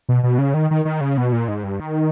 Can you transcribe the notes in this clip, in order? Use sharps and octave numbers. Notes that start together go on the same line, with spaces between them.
B2
B2
C#3
D#3
D#3
D#3
C#3
B2
A#2
G#2
G2
D#3